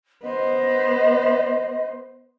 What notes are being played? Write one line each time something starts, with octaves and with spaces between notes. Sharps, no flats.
B3 C5 D#5